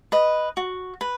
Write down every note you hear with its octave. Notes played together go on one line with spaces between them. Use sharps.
B4 D#5
F#4
B4